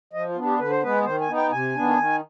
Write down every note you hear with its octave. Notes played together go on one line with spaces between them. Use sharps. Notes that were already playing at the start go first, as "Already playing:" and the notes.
F3 D#5
F4
B3 D4
G4
D3 B4
C5
G#3 B3 B4
D#3 C5
G#5
B3 D#4
G5
C3 G#5
D#3 B3 D4
D#3